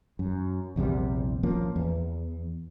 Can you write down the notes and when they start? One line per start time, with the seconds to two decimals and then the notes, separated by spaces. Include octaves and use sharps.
0.19 F#2
0.76 A#1 E2 C3 G3
1.43 A1 F3 A#3 C#4
1.76 E2